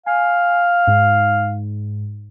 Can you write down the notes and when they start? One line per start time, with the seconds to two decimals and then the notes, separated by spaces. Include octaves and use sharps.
0.06 F5 G#5
0.87 G#2